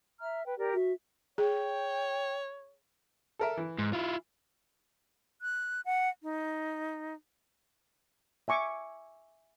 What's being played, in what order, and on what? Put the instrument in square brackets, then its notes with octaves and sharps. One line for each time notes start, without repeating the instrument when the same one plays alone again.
[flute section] E5 A#5 F6
B4 G5
G4 A#4 D5
[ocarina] F#4 [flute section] E5
[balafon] G#4 [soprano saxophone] C#5 [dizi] G5
[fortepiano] A4 A#4 E5
E3
[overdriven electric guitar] G#2
E4 F4
[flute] F#6
F#5
D#4
[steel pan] E5 G#5 C#6 D6